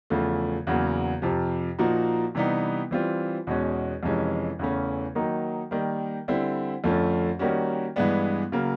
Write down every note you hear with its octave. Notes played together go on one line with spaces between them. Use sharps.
E2 C#3 F3 A3
E2 C#3 F#3 A#3
F2 C3 F3
A#2 F3 A#3 D#4 F#4
C3 E3 G3 B3 D#4
E3 G3 C4 F4
E2 B2 G#3 C#4
F2 C3 E3 G#3 C#4
E2 C#3 E3 A3 C#4
D#3 F#3 A#3 D#4
D#3 G3 A#3
D3 G3 C4 E4
F2 D3 F3 A3 C#4
D#3 G3 A#3 C#4 F#4
G2 E3 G#3 B3 D4
C#3 F#3 A#3